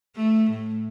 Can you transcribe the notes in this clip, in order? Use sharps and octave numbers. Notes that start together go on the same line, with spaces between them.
A3
A2